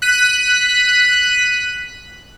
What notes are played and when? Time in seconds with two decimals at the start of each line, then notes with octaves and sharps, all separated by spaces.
0.02 F#6 B6 D#7